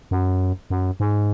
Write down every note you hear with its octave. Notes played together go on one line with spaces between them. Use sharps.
F#2
F#2
G#2